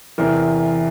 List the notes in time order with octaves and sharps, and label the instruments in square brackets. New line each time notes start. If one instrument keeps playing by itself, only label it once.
[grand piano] E2 C3 E3 A#4